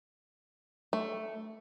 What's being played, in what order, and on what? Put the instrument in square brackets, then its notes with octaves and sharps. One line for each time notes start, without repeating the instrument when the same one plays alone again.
[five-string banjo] A3